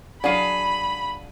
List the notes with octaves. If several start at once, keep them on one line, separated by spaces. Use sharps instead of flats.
F#3 D4 G#4 F5 F#5 B5 D#7